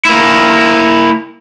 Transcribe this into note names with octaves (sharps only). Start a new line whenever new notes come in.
A#3 E4